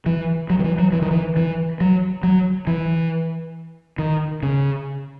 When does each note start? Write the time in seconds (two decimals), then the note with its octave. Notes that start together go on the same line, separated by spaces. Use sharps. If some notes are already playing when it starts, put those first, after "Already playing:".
0.06 E3
0.50 F#3
0.59 D#3
0.64 E3
0.79 F#3
0.92 E3
1.02 D#3
1.11 E3
1.37 E3
1.81 F#3
2.23 F#3
2.67 E3
3.99 D#3
4.43 C#3